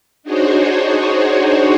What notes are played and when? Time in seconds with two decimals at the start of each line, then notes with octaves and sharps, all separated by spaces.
0.23 D4 D#4 F#4 G#4 C5 C#5